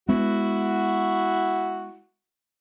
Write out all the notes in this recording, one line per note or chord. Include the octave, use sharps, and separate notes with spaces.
G#3 B3 E4 F#4